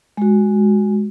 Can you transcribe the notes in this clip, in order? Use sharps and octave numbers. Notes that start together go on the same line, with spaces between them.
G#3 F#4